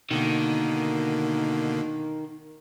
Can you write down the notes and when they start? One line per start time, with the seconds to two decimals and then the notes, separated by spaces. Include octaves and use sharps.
0.11 B2 D3 D#3 A#3